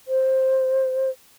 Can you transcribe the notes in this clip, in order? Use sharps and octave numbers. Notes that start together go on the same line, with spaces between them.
C5